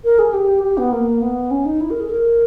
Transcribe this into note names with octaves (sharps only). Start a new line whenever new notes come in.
A#4
G#4
G4
G4
B3
A#3
B3
C#4
D#4
E4
A#4
G#4
A#4